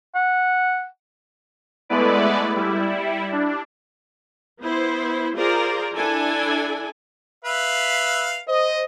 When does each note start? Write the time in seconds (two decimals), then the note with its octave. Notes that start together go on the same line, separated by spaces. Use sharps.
0.15 F#5
1.89 G#3 A3 B3 E4 B4 D5
2.55 G3 E4
3.32 D4
4.61 B3 E4 C5
5.36 F4 G#4 A#4 C5 D5 A#5
5.94 D4 E4 A4 G#5
7.45 B4 E5 F5
8.48 C5 D#5